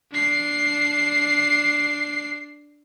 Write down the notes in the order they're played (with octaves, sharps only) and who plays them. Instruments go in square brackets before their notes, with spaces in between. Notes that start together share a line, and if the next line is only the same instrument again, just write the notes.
[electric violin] D4 C7